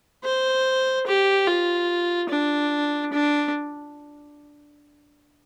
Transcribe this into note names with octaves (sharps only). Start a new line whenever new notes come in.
C5
G4
F4
D4
D4